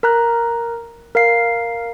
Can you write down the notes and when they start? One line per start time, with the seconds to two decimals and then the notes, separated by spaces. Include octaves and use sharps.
0.03 A#4 A#5 F#6
1.15 A#4 F5 C7